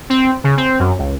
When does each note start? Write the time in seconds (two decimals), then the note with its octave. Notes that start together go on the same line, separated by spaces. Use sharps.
0.10 C4
0.44 C#3
0.57 C4
0.79 F#2
0.99 C#2